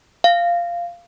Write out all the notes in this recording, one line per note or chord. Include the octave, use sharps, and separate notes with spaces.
F5